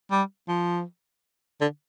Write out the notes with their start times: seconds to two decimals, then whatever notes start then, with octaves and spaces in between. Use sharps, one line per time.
0.11 G3
0.48 F3
1.61 D3